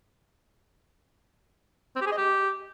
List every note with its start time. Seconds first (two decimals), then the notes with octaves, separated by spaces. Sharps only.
1.96 C4
2.01 G4
2.07 G#4
2.12 D#5
2.18 G4